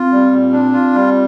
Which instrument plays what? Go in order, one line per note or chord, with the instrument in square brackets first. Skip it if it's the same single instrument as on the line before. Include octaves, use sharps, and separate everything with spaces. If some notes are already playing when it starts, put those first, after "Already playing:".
Already playing: [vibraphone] C4 [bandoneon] F4
[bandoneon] G3
A#2
D4
F4
G3